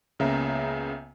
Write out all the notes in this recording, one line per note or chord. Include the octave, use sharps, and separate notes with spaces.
C#2 C#3 A#3 B3 E5 A#5